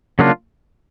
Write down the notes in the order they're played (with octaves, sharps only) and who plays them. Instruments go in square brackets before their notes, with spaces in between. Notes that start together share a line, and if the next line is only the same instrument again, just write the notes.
[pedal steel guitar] C#3 F#3 A#3 D4 F4